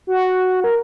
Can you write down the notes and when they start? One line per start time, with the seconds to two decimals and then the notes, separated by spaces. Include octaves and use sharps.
0.07 F#4
0.64 A#4